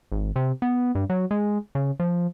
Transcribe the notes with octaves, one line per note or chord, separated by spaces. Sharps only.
G#1
C3
B3
G2
F#3
G#3
C#3
F3